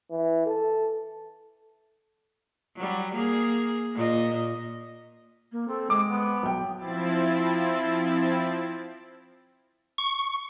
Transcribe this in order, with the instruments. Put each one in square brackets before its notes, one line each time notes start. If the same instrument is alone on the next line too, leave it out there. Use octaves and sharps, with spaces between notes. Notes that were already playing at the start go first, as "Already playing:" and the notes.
[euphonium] E3
A4
[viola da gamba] F#3 G3
A#3 G#4
A#2 D#5
[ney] A#3
[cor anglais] C4 [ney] A4
[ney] G#3 [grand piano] D6
[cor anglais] B3
[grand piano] B1 G5
[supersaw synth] F3 C4 E4 A6
[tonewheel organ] C#6